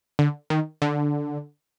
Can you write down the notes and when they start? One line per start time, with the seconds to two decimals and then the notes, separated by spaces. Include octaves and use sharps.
0.19 D3
0.50 D#3
0.82 D3